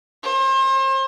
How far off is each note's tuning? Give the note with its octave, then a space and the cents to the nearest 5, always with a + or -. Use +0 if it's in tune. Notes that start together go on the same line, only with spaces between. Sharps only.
C5 +35